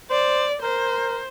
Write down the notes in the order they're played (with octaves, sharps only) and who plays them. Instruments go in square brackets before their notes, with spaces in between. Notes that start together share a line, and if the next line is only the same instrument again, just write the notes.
[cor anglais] C5 [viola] D5
[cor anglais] A#4 [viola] C5